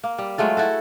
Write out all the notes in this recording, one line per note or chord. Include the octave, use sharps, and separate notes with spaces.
A#3
G3
F#3 G#3 A3 F4
E4 F#4 A4